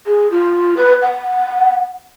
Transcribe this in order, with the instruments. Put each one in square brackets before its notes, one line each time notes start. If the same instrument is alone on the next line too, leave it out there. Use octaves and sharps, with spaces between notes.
[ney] G#4
F4
B4
F#5